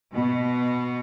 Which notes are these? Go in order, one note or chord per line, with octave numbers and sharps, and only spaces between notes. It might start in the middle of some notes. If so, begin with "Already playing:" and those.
B2